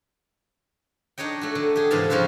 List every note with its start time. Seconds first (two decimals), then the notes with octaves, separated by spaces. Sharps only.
1.18 D4 D#4 C#5 D#5 G5
1.41 A3 F#4
1.55 D3
1.76 G4 G#4
1.91 G#2 C3 E3 D4 F5 A5
2.10 C#3 F3 G3 F#4 C5 F5